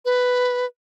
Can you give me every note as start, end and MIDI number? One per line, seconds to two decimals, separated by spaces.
0.05 0.65 71